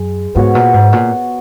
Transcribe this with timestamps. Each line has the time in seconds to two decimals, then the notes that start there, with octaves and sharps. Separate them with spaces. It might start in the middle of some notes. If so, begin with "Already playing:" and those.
Already playing: F#2 G#3 G#4
0.35 G#2 B3 F#4 C#5
0.55 A#2
0.74 G#2
0.92 A#2